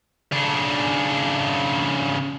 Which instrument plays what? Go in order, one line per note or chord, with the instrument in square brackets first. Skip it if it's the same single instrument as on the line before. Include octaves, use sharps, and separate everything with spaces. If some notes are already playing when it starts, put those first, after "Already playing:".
[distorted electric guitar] C#3 D4